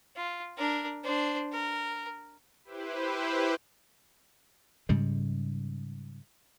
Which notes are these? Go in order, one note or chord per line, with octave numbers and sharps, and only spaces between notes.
F4
D4 A#4
D4 C5
A#4
E4 G4 B4 C5
G#2 C#3 G3 G#3